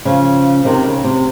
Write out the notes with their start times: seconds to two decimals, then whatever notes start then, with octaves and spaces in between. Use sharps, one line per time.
0.05 C#3 F3
0.65 C3 D#3
0.85 C#3
1.04 C3